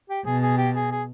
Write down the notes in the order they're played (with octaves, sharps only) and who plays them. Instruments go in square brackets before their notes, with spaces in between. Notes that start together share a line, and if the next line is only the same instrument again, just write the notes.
[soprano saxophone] G4
[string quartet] B2 [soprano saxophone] G#4
[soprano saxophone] G#4
G4
G#4
G#4